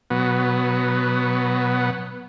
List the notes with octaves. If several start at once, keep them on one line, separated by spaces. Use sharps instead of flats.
B2 F#3 B3